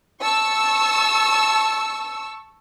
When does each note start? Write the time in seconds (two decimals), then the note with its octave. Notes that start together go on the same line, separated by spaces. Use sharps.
0.22 A5 C#6 E6